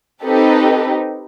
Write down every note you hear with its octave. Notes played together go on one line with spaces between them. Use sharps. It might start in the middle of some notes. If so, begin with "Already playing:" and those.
C4 D#4 G4 A4 B4